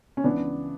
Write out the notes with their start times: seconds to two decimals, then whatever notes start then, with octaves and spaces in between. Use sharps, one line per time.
0.17 C#4
0.24 C#2 C#3 E3 B3 D4